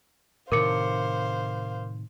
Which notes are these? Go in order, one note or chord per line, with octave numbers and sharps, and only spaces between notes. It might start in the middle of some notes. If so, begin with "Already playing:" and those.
A2 C3 D#3 A#4 C5 F5 D6 C#7